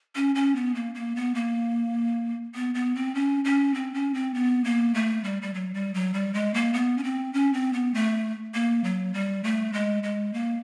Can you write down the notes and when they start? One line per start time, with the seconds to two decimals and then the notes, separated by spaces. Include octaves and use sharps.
0.15 C#4
0.35 C#4
0.56 B3
0.75 A#3
0.95 A#3
1.16 B3
1.35 A#3
2.55 B3
2.75 B3
2.95 C4
3.15 C#4
3.45 C#4
3.74 C4
3.94 C#4
4.14 C4
4.34 B3
4.64 A#3
4.94 A3
5.24 G3
5.42 G3
5.54 F#3
5.74 G3
5.94 F#3
6.14 G3
6.34 G#3
6.54 A#3
6.74 B3
6.98 C#4
7.04 C4
7.33 C#4
7.53 C4
7.73 B3
7.94 A3
8.54 A#3
8.84 F#3
9.14 G3
9.44 A3
9.73 G#3
10.03 G#3
10.34 A#3